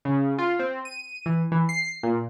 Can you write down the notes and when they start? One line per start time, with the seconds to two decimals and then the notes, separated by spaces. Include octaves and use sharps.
0.05 C#3
0.38 F4
0.59 C4
0.85 D#7
1.26 E3
1.52 E3
1.69 C7
2.03 A#2